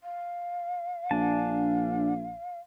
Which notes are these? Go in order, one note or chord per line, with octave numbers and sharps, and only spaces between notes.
F5
A#1 D4 G#5 A5